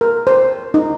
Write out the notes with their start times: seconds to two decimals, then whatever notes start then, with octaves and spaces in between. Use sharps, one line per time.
0.01 A#4
0.27 C5
0.74 D#4